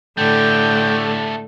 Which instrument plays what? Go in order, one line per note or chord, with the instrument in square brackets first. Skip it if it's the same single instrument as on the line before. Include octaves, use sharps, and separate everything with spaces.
[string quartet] A2 D3 [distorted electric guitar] A3 G4 [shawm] G5